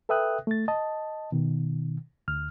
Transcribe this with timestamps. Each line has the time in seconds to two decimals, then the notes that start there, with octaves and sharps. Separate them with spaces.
0.09 A4 B4 E5 G5 D#6 F#6
0.47 A3 A6
0.68 D#5 A5
1.32 B2 D#3
2.28 D2 F6